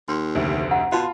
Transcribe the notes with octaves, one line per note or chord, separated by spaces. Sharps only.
D#2 C6
F1 D2
F#5 A#5
B2 F4 A5 B5 C6